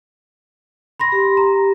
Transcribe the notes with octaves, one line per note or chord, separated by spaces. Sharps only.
B5 C6 A#6
G4
A#5